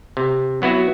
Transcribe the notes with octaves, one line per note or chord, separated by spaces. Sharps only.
C3
F#3 B3 E4 F#4